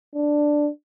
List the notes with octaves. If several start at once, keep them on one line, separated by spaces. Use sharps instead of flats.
D4